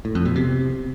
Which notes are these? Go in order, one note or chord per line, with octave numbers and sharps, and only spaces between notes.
A2
F2
B2
C3